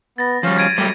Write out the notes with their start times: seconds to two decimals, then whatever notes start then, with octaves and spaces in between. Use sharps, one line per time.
0.18 B3 A6 A#6
0.43 F3 G3 C#4 F5
0.58 G#6 D7 D#7
0.78 F#3 G3 A3 G4